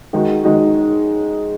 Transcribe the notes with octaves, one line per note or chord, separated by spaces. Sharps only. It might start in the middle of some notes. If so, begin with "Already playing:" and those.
D#3 G#3 D#4 F#4
D#3 G#3 D#4 F#4